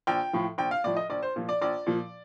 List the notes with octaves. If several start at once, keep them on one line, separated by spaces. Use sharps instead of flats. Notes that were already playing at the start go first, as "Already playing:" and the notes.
A#1 G5
A2 F3
A#1 G5
F5
A2 F3 D5
D#5
A#1 D5
C5
A#2 F3
D5
A#1 D5
A#2 F3